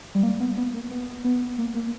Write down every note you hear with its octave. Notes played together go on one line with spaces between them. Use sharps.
G3
A#3
B3
B3
A#3
B3
B3
A#3
A#3